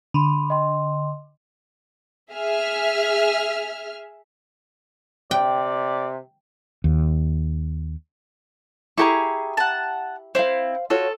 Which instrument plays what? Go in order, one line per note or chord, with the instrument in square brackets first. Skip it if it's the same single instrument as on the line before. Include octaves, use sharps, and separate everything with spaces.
[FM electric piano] D3 [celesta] B5 C6
[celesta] D#5 G5 C6
[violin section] G#4 E5 F6
[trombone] C3 [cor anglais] D5 [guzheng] G5
[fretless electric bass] D#2
[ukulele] E4 G4 A#5 [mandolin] G#4 A#4 C#6
[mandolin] F#5 A5
[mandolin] C4 E4 [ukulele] C5 F5
[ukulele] F4 F#4 C#5 [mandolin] A4